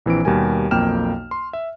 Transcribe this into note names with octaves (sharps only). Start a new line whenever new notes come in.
A#1 E3 C4 D7
D#2 B2 G3 A#4 G#5
B1 F2 A#3 G5 F6 E7
C6
E5